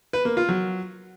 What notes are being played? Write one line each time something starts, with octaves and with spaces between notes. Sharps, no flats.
B4
A#3
F4
F#3